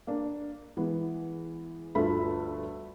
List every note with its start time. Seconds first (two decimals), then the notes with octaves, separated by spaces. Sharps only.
0.07 A#3 D4
0.77 E3 G#3 B3
1.95 G1 D2 A3 F4 E5 B5